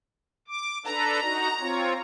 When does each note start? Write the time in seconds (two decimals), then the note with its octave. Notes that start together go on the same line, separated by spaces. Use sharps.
0.48 D6
0.86 D4 A4 B4 A#5
1.22 D#4 F#4
1.60 C4 F4 C#5